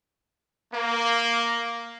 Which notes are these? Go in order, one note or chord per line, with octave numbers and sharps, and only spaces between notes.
A#3